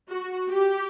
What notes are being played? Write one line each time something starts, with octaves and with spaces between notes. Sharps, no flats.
F#4
G4